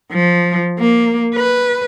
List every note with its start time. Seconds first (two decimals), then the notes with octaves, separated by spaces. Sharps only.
0.12 F3
0.79 A#3
1.35 B4